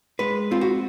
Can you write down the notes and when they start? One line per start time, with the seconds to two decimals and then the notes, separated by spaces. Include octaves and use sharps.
0.19 G#3 B4
0.51 C4 F4
0.61 F#4